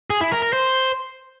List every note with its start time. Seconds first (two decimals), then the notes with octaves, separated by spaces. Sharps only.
0.10 G#4
0.21 E4
0.32 A#4
0.42 A#4
0.53 C5